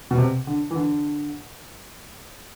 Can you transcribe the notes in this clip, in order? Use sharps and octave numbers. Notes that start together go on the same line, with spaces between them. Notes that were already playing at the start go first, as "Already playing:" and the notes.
B2
C3
D3
E3
D3